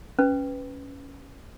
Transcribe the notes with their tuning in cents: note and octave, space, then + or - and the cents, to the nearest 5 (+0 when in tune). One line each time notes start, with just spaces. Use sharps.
C#4 +0 B4 +10